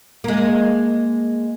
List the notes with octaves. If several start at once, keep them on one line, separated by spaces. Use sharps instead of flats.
G#3 A#3